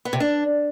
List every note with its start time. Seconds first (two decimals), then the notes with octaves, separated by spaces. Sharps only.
0.05 B3
0.13 C3
0.20 D4